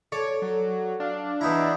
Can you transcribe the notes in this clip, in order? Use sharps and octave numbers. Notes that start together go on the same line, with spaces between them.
A4 C#5 D5
F#3
D4 F5
E2 D#4 E4 A#5